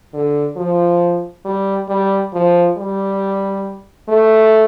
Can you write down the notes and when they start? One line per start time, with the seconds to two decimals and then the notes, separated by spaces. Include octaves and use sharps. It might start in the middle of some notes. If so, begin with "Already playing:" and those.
0.14 D3
0.57 F3
1.45 G3
1.89 G3
2.33 F3
2.77 G3
4.09 A3